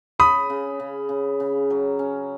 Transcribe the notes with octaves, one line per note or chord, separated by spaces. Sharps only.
C#3 B5 D#6
C#3
C#3
C#3
C#3
F#3
C#4